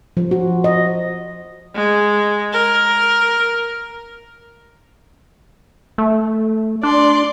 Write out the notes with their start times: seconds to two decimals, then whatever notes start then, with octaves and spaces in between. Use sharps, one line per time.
0.17 F3
0.31 F#4
0.64 D#5
1.75 G#3
2.53 A#4
5.98 A3
6.83 D4 D5 C6